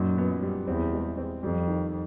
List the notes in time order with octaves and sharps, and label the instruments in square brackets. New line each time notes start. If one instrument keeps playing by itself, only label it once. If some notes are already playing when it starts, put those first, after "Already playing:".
Already playing: [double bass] F#2 [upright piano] A#2 D#4
[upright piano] B3
G3
[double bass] E2 [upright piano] C4
[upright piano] G#3
C4
[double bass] F2 [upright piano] G3
[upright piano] D#3